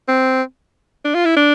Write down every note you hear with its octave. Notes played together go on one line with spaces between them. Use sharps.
C4
D4
F4
E4
D4